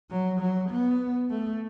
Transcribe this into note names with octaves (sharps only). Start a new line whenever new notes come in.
F#3
F#3
B3
A3